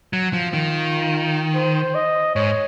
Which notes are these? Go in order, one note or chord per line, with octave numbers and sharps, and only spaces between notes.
F#3
F3 F4
D#3
C5
D#5
G#2 C#5